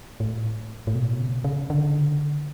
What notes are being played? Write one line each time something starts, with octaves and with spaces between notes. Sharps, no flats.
A2
A2
B2
C#3
C#3
D3